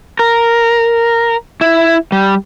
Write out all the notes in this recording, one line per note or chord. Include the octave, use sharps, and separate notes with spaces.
A#4
E4
G3